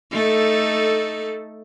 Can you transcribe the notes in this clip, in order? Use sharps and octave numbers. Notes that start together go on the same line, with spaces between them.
A3 D#4 A4